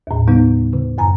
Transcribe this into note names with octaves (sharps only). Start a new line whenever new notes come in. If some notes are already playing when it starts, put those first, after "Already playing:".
D#2 A2
C#3 G3 B3 D#4
C#3
F#2 G#5 A#5